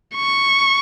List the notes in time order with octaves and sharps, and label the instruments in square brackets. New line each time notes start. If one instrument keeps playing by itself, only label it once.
[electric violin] C#6